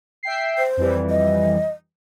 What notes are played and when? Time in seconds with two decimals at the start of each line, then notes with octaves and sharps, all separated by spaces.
0.23 E5 G5 C7
0.58 C5
0.77 F2 E3 G3
1.10 D#5